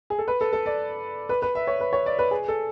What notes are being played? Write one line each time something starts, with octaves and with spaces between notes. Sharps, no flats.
G#4
A4
B4
A4
A4
D5
B4
B4
E5
C#5
B4
C#5
D5
B4
G#4
A4